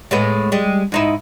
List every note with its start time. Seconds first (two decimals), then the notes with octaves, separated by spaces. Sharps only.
0.11 A2 G#3 B3
0.52 G3 G#3
0.92 G#2 D#4 E4